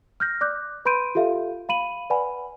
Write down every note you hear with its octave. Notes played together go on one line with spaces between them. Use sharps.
F6 G6 A#6
D5 D6 F#6 G6
B4 B5 C6 G6 D7 D#7
F4 G4 A4 E5 F5
F5 B5 D#7 F#7
B4 D5 F#5 G#5 B5